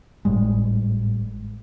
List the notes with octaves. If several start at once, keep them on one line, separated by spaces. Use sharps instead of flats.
G#1 A2 G3 G#3